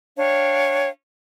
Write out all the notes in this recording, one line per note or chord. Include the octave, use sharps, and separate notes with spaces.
D4 C#5 F5 G5